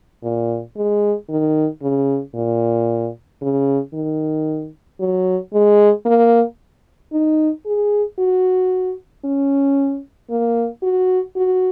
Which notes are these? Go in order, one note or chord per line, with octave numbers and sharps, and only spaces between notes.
A#2
G#3
D#3
C#3
A#2
C#3
D#3
F#3
G#3
A#3
D#4
G#4
F#4
C#4
A#3
F#4
F#4